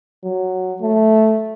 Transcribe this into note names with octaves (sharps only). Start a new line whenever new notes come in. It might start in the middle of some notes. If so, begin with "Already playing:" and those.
F#3
A3